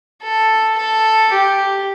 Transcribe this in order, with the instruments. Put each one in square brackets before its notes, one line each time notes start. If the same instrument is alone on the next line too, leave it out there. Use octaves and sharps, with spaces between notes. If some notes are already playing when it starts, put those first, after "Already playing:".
[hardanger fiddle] A4
A4
G4